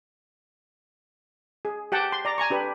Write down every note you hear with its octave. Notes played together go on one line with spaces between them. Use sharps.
G#4
G4 F#5 G5 A5
C6
D5 A#5
G#5 A#5 C#6
D4 G4 B4